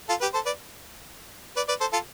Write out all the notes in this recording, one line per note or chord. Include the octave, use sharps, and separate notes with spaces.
F4 A4
G4 B4
A4 C5
B4 D5
B4 D5
B4 D5
A4 C5
F4 A4